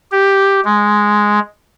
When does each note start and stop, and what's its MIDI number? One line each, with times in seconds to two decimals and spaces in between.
0.12 0.60 67
0.65 1.39 56